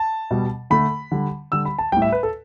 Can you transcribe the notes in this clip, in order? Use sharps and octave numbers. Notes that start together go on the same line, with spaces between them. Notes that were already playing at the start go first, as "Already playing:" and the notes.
Already playing: A5
B2 G3
D3 A3 B5
D3 G3
D3 G3 E6
B5
A5
A2 G3 G5
E5
B4
A4